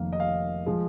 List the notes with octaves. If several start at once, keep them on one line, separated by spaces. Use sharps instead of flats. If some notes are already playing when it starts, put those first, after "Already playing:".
Already playing: F1 F2 D#3 A#3 F5
D#5
F5
F3 G#3